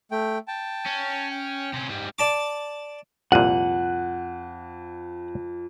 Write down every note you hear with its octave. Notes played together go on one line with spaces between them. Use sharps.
A3 G5
G5 A5
C#4
G5
C3 C#4
G#2 G3
D5 A5 D6
C2 F2 A#2 F#5 F#6 D#7